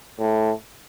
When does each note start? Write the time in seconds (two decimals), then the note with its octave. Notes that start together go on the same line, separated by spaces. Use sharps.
0.20 A2